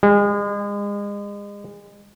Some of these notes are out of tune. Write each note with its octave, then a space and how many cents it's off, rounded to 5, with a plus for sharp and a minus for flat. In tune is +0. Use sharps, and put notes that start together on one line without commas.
G#3 -35